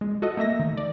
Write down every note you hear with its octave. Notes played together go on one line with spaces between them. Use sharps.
G#3
F#4 A4 D#5
A3 A#3 E5 A#6
D#3
D5